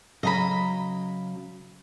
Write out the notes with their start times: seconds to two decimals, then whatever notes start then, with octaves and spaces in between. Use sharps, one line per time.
0.23 C#3 F#3 D#5 A#5 B5